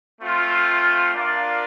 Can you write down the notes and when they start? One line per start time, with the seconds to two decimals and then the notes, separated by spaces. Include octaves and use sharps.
0.20 A3 C4 F4
1.14 D4 F4 A#4 D5 F5